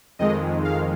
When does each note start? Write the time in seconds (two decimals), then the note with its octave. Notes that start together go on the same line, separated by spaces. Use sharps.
0.19 F2 D#3 G#3 D#5
0.65 F5